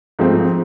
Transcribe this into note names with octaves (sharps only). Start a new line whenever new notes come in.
G#2 F3 A3 C4